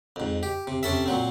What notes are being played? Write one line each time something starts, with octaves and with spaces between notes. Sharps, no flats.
F2 G#2
G4
C3
C3 C#4 A4 E5
A#2 F#3 C4